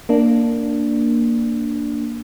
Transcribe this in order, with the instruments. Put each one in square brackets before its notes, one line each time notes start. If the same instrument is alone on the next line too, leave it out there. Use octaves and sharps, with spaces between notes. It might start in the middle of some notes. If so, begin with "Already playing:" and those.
[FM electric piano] A#3 D4